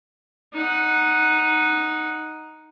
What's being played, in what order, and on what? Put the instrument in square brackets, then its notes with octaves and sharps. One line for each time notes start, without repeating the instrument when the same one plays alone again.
[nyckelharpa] D#4 F#5